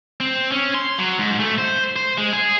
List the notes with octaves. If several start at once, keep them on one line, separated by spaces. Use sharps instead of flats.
C4
C#4
C6
F#3
G#2
A3
C5
C5
G#3
G#4